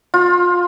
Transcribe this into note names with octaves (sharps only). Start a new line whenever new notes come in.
F4